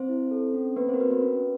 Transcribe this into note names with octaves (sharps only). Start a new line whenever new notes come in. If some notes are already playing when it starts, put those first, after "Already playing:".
Already playing: C4 C5
E4
A4
C#4
A#3 B3 B4
C4 A#4 C5
B3 F#4 B4
B3 B4
C#4